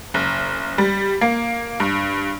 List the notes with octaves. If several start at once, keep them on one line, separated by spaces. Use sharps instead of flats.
F#1
G3
A#3
G2